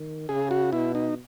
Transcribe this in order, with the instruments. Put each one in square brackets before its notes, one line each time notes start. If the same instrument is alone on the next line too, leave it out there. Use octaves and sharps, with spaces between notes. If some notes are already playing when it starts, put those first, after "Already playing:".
Already playing: [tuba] D#3
[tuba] C#3 [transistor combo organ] G#4
[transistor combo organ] F#4
[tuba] B2 [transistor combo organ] E4
[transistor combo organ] D#4